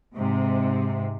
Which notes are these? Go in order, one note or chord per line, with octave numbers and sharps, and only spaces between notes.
G#2 C3